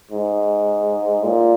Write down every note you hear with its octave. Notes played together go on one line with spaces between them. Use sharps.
G#2
A#2